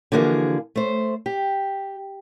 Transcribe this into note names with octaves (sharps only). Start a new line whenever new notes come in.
D3 E3 F3 A#3 F#4 G#4
A3 C5
G4